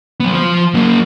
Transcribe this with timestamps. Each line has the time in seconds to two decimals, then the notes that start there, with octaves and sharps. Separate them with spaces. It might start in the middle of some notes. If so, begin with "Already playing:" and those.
0.20 F#3 B3
0.34 F3 C5
0.74 F#3 A#3